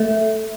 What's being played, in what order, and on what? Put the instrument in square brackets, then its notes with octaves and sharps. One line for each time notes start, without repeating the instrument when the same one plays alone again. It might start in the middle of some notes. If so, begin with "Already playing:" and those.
Already playing: [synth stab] A3